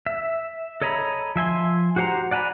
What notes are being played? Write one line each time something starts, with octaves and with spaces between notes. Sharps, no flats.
E5
A4 C#5 D#5 A#5 B5
F3 E5 G#5 C6
F#4 G4 C5 F#5 A#5
D5 F#5 G#5 A#5 B5